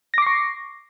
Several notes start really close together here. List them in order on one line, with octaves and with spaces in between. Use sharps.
A#6 D6 C7 C#6